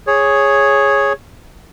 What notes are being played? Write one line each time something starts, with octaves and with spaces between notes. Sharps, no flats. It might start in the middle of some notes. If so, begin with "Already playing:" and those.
G#4 C#5